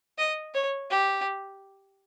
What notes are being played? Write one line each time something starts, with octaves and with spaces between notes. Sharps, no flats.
D#5
C#5
G4